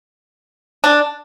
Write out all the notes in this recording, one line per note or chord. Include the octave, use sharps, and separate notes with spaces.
D4